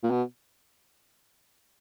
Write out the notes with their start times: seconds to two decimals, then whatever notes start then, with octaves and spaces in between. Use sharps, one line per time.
0.03 A#2
0.11 B2